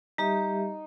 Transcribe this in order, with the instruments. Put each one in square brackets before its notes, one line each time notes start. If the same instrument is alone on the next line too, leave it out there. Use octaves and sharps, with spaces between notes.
[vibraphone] G3 G4 E5 [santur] D#4